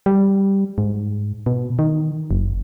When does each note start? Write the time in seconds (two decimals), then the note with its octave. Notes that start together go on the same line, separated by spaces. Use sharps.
0.06 G3
0.78 G#2
1.46 B2
1.79 D#3
2.31 F#1